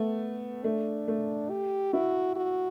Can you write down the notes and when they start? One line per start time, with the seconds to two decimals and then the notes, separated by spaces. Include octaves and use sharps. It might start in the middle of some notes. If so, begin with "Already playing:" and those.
Already playing: A3 B3
0.64 A3 D4
1.08 A3
1.50 G4
1.93 E4 F#4
2.36 F#4